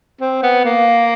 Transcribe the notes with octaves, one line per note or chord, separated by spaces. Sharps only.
C4
B3
A#3